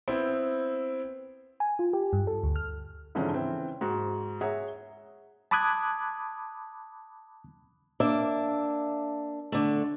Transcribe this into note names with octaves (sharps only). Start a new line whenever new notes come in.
B3 C4 E4 C5
G#5
F4
G4
G2
A4
D2
F6
F2 G#2 D3 E3 F3 C#4
C#3 E3 C4
G#2 F#4
G#4 C#5 E5 F#5 A#5
A5 B5 D6 D#6 F#6 G#6
A#3 D4 E5
D3 A3